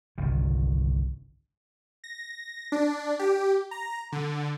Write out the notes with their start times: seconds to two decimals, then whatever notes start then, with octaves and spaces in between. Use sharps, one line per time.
0.18 G1 C2 G#2 D#3
2.04 A#6
2.72 D4
3.19 G4
3.71 A#5
4.12 D3